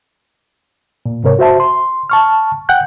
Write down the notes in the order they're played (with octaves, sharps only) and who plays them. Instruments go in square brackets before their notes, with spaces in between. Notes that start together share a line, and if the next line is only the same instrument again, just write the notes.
[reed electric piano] A#2
G#2 C3 A#4 C#5
F#4 C5 E5 A5
C6
A5 C#6 F6
F#5 G5 F#6 G6